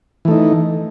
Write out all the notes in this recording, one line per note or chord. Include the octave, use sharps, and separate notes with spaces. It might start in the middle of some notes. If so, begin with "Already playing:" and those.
E3 A3 D#4